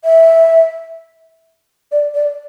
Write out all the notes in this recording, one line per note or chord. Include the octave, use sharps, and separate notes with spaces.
E5
D5
D5